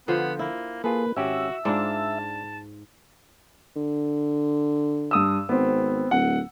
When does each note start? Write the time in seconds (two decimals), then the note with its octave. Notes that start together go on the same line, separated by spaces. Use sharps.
0.08 D3 F3 B3 C5
0.39 A#3 E4
0.84 A#3 F4 G#4 A4 B4
1.17 G#1 C#4 F#4 G4 E5
1.65 G#2 D4 F4 D5 A5
3.76 D3
5.11 G2 D#6 E6
5.49 G#1 B3 C4
6.11 D1 F#5